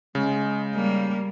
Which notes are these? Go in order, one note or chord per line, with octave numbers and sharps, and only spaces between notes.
C#3 G#3
G3 A#3